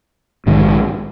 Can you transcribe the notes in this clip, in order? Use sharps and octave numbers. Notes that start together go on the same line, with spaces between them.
A#1 G#2 D#3